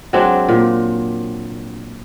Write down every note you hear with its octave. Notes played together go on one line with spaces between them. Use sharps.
F#3 G#3 C4 D4
A#2